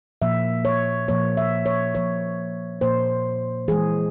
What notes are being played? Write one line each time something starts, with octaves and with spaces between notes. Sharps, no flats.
A#2 F3 A#3 E5
C#5
A#2 F3 A#3 C#5
E5
C#5
A#2 F3 A#3 C#5
A#2 F3 A#3 C5
E3 G#3 G#4